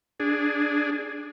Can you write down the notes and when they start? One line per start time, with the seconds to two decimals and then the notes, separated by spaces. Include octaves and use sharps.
0.20 D4 G#4